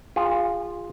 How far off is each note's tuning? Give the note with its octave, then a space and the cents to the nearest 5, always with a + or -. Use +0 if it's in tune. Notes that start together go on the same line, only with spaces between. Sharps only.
F4 +0 G#4 -30